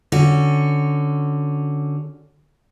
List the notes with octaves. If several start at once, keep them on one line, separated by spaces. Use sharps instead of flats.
D3 C#4 F#4